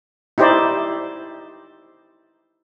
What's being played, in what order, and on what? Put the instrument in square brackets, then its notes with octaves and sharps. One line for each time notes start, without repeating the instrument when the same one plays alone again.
[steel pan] D#4 E4 G4 C5 D5